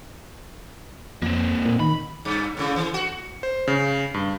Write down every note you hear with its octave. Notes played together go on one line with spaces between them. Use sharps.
F2 A#3 C4
A#2
D#3 B5
G2
A2 C#3
E3
F#4
C5
C#3
G2